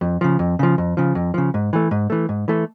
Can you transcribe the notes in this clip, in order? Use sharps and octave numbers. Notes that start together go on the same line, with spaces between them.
F2
C#3 F3
F2
C#3 F3
F2
C#3 F3
F2
C#3 F3
G#2
E3 A3
G#2
E3 A3
G#2
E3 A3